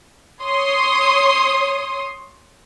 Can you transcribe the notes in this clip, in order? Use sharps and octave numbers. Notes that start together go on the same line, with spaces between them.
C#5 C6 D#6